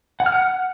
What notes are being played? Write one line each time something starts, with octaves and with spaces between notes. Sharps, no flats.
F#5
F6
F#5